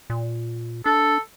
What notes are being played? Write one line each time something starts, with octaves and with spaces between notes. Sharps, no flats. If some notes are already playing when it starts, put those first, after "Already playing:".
A#2
D4 A4